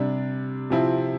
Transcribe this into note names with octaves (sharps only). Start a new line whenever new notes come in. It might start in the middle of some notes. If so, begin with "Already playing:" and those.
Already playing: C3 G3 D4
C3 F3 C4 E4